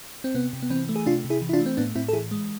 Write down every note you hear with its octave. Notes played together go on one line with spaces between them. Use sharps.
C4
C3 B3
C3
B3
E3 C4
A3
G#4
C3 D4 F4
C3
E4 G#4
E3
E4
D4 F4
A3
C4
A2 B3 D4
A2 C4 E4
A4
E3 E4 G#4
G#3